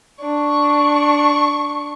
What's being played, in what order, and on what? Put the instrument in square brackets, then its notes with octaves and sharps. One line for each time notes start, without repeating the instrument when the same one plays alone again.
[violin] D4 C#6